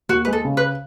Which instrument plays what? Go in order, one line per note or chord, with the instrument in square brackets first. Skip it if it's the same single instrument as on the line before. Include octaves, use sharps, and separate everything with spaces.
[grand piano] D#2 [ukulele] F#4
[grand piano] G#3 [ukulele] B4
[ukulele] A4
[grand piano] C#3
[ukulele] B4